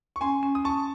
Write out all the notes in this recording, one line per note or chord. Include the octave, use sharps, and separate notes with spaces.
C#6
C#4 G#5 C6
C#4
D#6
C#4 A5 C#6